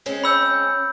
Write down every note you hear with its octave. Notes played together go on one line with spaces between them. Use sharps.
G#3 C4 C#4
C#5 B5 E6 G6